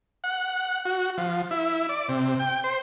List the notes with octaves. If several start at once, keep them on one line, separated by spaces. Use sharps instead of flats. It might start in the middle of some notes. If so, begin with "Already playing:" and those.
F#5
F#4
F3
E4
D5
C3
G5
C5